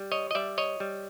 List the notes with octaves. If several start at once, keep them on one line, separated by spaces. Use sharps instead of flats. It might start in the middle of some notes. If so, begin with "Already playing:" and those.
Already playing: G3
C#5 D#5
D#5
G3 D5 E5
C#5 D#5
G3